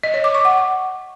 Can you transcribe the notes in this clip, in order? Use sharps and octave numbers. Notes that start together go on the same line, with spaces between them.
D#5
C#5
D6
C#6
F#5